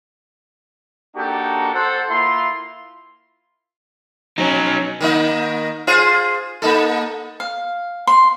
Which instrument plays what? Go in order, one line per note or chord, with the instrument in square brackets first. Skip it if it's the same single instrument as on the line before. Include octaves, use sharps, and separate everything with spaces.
[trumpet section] A#3 D4 D#4 F#4 G4 A4
A4 C5 F#5
A#3 E4 F4 C6
[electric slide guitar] F#3 D#4 [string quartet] C#4
[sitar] D#3 A#3 D#4
F4 G#4 C5
A#3 D#4 A4
[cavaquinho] F5
C6